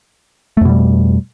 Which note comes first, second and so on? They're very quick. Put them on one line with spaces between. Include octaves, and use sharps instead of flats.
A3 F2 B2 G3